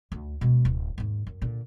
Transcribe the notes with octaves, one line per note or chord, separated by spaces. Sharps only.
D2
B2 G#3
D1
D#2 G#2
F#2
A#2 D3